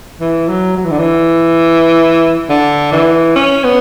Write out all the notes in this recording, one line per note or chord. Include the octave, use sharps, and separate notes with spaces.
E3
F#3
F#3
E3
D3
E3
D3
E3
C#4
B3